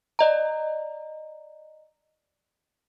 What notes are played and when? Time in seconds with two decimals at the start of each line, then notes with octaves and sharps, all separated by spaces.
0.19 D5 D#5 A#5